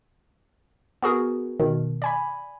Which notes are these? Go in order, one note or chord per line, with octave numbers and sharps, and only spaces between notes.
B3 F#4 G#4 A#4
B2 D#3
D5 G#5 B5